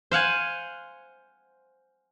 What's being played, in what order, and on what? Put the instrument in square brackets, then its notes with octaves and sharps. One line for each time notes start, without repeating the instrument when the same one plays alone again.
[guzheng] C5 F5 F#5 G#5